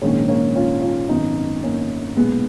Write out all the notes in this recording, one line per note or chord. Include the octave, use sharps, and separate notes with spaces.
A#1 G#2 D#3 A#3 C#4
A#3 C#4
C#4 F4
C#4 F4
G#1 F#2 D#3 B3 D#4
A#3 C#4
B1 A#2 G#3 B3